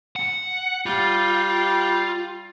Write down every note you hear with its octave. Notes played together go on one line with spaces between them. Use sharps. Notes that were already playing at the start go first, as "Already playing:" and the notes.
F#5
G3 F4